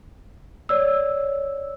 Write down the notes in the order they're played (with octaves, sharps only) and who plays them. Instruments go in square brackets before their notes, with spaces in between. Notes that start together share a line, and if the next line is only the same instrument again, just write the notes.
[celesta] C#5 D5 E6